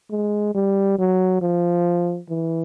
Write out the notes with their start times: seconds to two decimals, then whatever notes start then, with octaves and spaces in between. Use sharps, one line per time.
0.11 G#3
0.55 G3
0.99 F#3
1.42 F3
2.29 E3